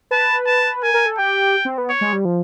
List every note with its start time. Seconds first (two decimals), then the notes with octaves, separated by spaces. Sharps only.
0.11 B4 A5
0.46 A5
0.83 A#4 G#5
0.94 A#4
1.06 A4
1.18 G4 G5
1.65 C4
1.78 B3
1.89 C#5
2.01 G#3
2.13 G3
2.25 F3